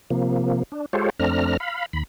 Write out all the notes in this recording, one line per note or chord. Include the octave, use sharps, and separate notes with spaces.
C3 F3 A#3
D4
G#3 F4 G4 A4 C5 C#5
F2 A3 C4 D4 A#5 F6
F5 B5
D#2 B5